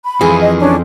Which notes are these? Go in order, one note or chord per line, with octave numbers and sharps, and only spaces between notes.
B5
F2 E3 G#4
D#5
C#4 D4